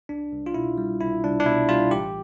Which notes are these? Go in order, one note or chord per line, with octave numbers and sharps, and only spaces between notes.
C2 D4
C2
F4
B2 E4
G3
C2 E4
C2 D4
D4
B2 E4
G3 F4
A1 G4